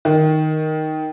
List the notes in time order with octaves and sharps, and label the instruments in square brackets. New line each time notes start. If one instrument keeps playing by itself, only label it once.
[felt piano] D#3